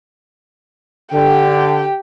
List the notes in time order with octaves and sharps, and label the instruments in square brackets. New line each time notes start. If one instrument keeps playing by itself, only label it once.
[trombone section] D3 [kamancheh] G4 G5